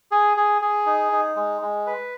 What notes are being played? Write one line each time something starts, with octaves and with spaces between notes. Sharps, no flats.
G#4
G#4
G#4
D#4
D#4
G#3
G#3
B4